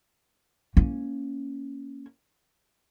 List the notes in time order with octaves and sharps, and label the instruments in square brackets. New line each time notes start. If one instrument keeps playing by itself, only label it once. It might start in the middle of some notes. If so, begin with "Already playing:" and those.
[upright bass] A#3 C#4